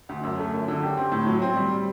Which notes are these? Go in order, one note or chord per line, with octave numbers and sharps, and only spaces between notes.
D2
F#2
A3
F#2
D3
G4
C4
A2
F#3
C4
G3